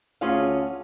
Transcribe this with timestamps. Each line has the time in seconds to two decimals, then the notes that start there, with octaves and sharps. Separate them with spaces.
0.21 D2 C#4 F4 G#4 F5